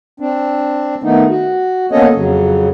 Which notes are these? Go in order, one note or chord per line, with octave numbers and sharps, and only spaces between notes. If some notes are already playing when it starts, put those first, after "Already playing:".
C4 D4
D#3 A3 B3 D#4
F#4
A#3 B3 C#4 A4 C#5 D#5
F2 C#3 F#3